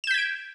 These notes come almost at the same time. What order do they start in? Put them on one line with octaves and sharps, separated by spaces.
E7 G6 B6 G#6 D7